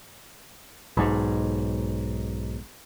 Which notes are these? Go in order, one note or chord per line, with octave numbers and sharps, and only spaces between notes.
B1 G#2